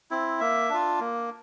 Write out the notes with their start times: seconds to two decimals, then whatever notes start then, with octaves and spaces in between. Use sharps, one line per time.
0.11 C4 E4
0.40 A#3 E5
0.70 D4 F4
1.00 A#3